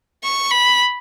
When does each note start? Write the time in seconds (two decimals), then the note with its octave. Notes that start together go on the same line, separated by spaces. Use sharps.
0.24 C#6
0.51 B5